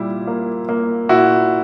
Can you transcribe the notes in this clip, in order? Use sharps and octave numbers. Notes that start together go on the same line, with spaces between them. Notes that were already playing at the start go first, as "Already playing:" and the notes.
Already playing: A#2 G3 E4
A#3
A#3
A#2 E4 F#4